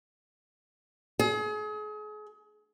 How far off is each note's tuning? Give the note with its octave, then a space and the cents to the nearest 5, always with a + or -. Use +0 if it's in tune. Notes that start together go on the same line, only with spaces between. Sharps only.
G#4 +35